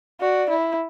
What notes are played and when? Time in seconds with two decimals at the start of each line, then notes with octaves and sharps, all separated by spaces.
0.20 F#4 D5
0.49 E4